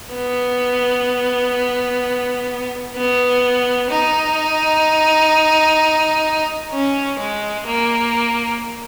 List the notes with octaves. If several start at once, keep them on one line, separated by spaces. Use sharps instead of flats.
B3
B3
D#4
C#4
G#3
A#3